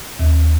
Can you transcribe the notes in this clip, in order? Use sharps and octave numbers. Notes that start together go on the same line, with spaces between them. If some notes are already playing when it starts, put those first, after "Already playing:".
D#2